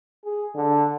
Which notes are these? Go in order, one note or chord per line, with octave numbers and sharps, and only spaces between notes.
G#4
D3